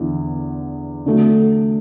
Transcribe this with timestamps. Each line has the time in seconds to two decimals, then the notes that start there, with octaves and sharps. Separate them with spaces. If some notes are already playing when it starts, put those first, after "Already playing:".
Already playing: E2 D3 B3 E4
1.06 D3 A3 F#4